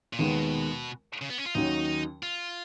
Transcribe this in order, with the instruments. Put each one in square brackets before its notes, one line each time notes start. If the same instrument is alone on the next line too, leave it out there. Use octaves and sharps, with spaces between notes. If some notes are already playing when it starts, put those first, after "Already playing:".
[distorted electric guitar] A#2
[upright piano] D#2 D#3 G#3 B3 [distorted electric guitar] B2
[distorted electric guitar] C#3
B3
C#4
F4
[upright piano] D#2 D#3 F#3 C#4 [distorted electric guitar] D#4
[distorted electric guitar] F4